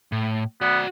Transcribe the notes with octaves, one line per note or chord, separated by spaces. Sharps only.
A2
B3 F#4 D5